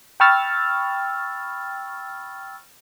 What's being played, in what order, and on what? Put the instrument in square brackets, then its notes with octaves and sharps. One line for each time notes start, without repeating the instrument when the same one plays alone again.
[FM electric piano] G5 B5 C#6 E6 F6 A6